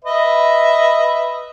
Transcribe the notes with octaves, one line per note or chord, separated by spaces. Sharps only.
B4 D#5 E5